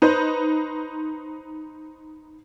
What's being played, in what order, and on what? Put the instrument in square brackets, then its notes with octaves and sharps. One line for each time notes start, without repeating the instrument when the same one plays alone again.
[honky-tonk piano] D#4 B4 C5